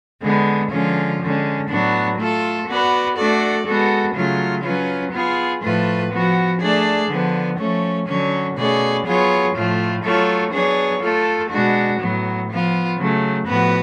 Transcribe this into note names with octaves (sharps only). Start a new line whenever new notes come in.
D3 G#3 B3
D3 F3 G#3 C#4 F4
D3 G#3 C#4
A2 F#3 B3 D4 F#4
A3 F4 A4
B3 F#4 B4 D5
A3 D4 F#4 A4 D5
G#3 B3 F#4 A4
C#3 F#3 A3 F4
F#3 C#4 F4 B4
B3 F4 G#4
A2 F3 A3 F4 B4
F3 B3 F#4
A3 D4 G#4 D5
D3 F3 B3
F3 A3 C#4
D3 F#3 C#4
B2 A3 C#4 G#4 D5
F#3 B3 F4 G#4 C#5
A2 F3 A3 F4
F#3 A3 F4 A4 C#5
F#3 B3 D4 G#4 C#5
A3 F4 A4
B2 G#3 D4 F#4
A2 F#3 B3
F3 B3 F4
C#3 F#3 A3
A2 F3 B3 F#4 B4